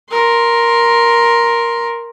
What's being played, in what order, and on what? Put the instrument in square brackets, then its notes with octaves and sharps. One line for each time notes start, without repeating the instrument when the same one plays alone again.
[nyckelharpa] A#4 C6